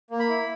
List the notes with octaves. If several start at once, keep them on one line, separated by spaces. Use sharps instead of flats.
A#3
B5
E4